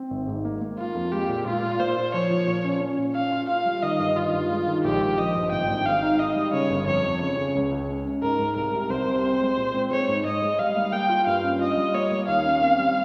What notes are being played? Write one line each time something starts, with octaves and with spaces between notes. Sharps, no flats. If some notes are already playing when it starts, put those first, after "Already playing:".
Already playing: C4
G#1
G#2
A#3
A#3
A#3 F4
F2
G#3 G4
A#2
A#2 F4
A#2
A#2 C5
F4
F3 C#5
F3
A#2
C#4
C#4
A#2
C#4 F5
F4
F4 F5
G3
D#3 D#5
G2
D#3 F4
G2
G#3
D#3
A#1 G4
A#1
F3 D#5
G2
G#1 G5
G#1
G#2 F5
D#4
D#4 D#5
G3
C#3 C#5
G1
F2 C#5
F2
C#3 C#5
C#3
C#2
C#2
C#4
C#4
G#2 A#4
G#2
C2 A#4
C3
C2 C5
C3
C4
G#3
A#2
C4
G#3 C#5
G#2
G#2 D#5
G#3
G3 F5
A#3
A#3 G5
F4
G2 F5
C#4
F4 D#5
G3
A#3 C#5
A#3
D#2 F5
C#4
C4
G3